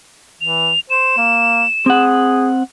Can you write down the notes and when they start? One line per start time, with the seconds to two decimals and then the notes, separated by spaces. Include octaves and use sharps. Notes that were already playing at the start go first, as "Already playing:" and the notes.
0.41 E3 F7
0.90 C5 E7
1.18 A#3
1.86 C4 G#4 F#5